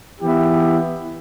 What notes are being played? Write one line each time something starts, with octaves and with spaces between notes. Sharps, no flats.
E3 B3 E4 G4